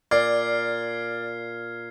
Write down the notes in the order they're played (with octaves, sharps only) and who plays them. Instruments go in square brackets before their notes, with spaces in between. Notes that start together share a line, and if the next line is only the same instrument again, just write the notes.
[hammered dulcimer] A#2 [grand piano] D5 [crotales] F6 G#6 C7